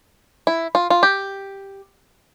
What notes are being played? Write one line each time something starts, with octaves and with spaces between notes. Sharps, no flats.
E4
F4
F4
G4